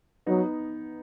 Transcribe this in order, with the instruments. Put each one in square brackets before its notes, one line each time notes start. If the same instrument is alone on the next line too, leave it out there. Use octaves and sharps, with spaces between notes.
[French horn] F#3 [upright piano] B3 D#4